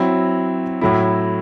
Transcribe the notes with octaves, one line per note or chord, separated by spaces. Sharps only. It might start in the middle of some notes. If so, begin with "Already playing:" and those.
Already playing: F#3 C4 E4
A2 F#3 A3 E4